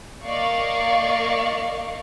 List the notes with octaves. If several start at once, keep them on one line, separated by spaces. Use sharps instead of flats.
A#3 D5 D#5 F5 C#6